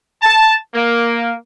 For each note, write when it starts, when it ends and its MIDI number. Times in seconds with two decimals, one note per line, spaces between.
0.23 0.54 81
0.74 1.33 58